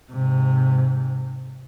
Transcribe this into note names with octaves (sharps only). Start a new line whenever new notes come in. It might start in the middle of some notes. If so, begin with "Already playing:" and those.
G#2 C3